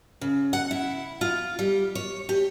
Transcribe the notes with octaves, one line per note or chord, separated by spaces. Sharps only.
C#3
F#5
E4
F4
G3
C#5
G4